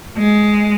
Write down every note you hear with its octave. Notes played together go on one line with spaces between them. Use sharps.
G#3